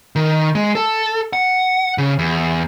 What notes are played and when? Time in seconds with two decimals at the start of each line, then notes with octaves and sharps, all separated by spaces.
0.16 D#3
0.55 G#3
0.75 A4
1.33 F#5
1.98 C#3
2.19 E2